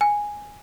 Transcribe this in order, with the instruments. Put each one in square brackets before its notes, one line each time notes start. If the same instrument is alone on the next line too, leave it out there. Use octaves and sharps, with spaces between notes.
[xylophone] G#5